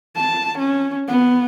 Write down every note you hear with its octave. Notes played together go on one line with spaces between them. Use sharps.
A5
C#4
B3